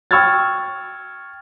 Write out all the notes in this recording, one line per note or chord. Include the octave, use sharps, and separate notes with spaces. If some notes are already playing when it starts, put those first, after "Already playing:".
G5 C#6 E6 F6 G#6 A6